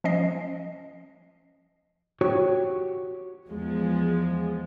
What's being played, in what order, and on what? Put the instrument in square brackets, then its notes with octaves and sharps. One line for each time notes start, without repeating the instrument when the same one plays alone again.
[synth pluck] F3 C#4 D#5 C7
[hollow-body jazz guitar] F#4 G4 C#5
[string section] E2 F3 G#3